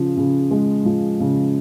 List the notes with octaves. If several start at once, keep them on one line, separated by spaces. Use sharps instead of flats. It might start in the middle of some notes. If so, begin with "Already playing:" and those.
Already playing: C#3 F3
C#3
G#3
F3
C#3